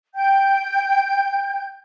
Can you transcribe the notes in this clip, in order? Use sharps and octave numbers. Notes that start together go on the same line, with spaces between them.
G5 G6